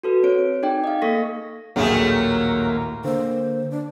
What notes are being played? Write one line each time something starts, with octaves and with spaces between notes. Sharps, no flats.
F#4 A4 B4
C4 C#5 D7
D#4 G#4 D5 G5
D#5 F5
A#3 A4 C#6 A#6 B6
A#1 D#2 A2 D#3 F#3 A3 A#3 G#4
D3 A#3 C5
D4